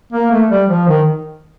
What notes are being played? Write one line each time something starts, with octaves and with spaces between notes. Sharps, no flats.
A#3
A3
G3
F3
D#3